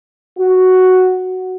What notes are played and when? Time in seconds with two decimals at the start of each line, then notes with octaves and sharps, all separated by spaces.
0.38 F#4